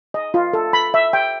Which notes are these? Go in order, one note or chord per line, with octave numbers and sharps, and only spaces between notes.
D#5
F4
A4
B5
E5
G5